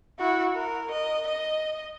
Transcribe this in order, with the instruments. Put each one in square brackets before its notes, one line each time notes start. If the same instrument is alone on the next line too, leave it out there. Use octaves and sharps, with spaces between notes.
[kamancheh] E4 F#4
A#4
D#5
D#5